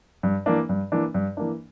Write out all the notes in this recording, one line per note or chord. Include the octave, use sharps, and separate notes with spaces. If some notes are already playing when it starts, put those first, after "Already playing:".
G2
E3 A#3 D4
G2
E3 A#3 D4
G2
E3 A#3 D4